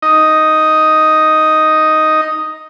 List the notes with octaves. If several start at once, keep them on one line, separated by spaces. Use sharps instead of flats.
D#4 D#5